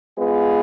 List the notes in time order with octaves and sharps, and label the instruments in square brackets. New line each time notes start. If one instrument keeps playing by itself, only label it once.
[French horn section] G#3 B3 F4 G#4 B4